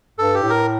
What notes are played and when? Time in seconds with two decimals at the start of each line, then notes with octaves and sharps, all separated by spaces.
0.19 G2 A4
0.34 G4
0.42 A2
0.50 A#4